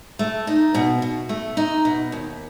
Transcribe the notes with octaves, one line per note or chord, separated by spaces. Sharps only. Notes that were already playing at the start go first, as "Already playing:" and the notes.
A3
D#4
B2
B2
A3
D#4
B2
D#2